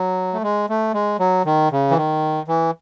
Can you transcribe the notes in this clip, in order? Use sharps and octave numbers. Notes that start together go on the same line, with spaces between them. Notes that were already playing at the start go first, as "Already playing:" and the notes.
Already playing: F#3
A3
G#3
A3
G#3
F#3
D#3
C#3
E3
D#3
E3